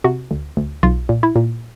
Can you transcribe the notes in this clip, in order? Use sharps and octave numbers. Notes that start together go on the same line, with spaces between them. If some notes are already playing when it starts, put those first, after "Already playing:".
C3 F#4
D2
D2
B1 F4
A#2
E4
A#2